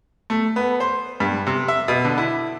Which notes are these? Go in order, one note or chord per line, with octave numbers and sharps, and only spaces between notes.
A3
B3
C5
G2
C3
E5
B2
D3
E4